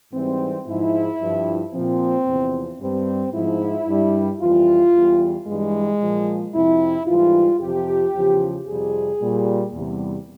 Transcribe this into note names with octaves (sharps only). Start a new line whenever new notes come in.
G#2 E3 G3 C4
G#2 F3 E4
G2 F3
A#2 F3 C4
E2 C3 F3
G2 G3 C4
G#2 F3 E4
G2 G3
F2 E3 G3 F4
E2 E3 G3
G2 E3 G3 G#3
A#2 F3
F2 C3 F3 E4
G#2 E3 G3 F4
F2 C3 F3 G4
E2 C#3 F3
F2 C3 G3 G#4
A#2 G3
E2 C3 G3